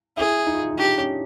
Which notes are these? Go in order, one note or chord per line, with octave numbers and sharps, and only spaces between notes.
E4 G#4
D#4
F4
E4
D#4
D4 G4
C#4